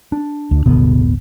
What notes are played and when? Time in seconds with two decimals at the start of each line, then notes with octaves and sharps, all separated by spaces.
0.12 D4
0.51 D2
0.66 D1 G1 B2 D3 B3